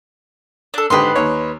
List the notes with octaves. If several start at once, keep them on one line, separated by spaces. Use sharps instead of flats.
D4 A4
G#1 D3 G4 B4 D#5 C6
D#2 C#5